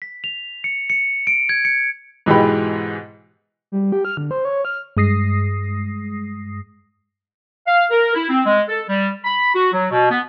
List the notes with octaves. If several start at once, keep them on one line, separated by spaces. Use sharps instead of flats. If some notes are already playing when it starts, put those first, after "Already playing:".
B6
F7
C#7
C#7
D7
G#6
C#7
G#2 B2 E3 G#3 G4 B5
G3
G4
F6
D3
C5
C#5
F6
G2 G#3 D#6 A#6 C7
F5
A#4
E4
C4
G#3
A4
G3
B5
F#4
F#3
B2
B3